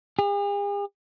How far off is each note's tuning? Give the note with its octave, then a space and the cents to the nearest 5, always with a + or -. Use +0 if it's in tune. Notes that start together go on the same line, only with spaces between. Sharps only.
G#4 -45